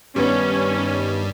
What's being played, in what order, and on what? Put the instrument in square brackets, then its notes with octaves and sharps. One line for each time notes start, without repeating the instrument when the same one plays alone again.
[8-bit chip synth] G2 G3 [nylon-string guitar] D#3 B3 D#4 [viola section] C#4